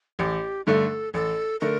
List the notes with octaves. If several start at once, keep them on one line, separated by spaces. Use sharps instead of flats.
A1 G4
G2 D3 A3 A4
A1 A4
D3 A3 A#4